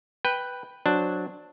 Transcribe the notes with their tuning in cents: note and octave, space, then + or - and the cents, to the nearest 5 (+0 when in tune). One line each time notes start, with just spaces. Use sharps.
B4 +0 G5 +0
F#3 -10 D4 +5 C5 +0